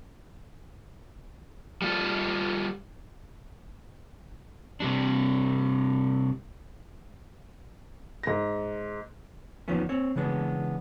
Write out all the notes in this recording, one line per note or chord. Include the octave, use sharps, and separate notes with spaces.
G3 F4 A4
C3 G3 D4
G#2 A#6
E2 D#3 F3 B3 C#4
C4 C#5
C#3 E3 G#3 B3 D4